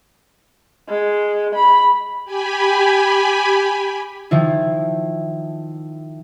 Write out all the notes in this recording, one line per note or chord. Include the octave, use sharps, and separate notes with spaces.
G#3
B5
G4 G#5 B5
D#3 F3 E4